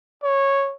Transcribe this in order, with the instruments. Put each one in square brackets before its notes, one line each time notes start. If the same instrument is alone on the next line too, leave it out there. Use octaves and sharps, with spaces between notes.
[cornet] C#5